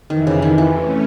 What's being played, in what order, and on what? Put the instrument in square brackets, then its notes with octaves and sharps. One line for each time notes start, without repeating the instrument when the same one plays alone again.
[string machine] F2 C3 E3 [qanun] D#3
[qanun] C#3
D#3
E3
[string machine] A3 C#4